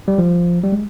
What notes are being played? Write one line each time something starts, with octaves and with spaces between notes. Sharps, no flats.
G3
F3
G3
G#3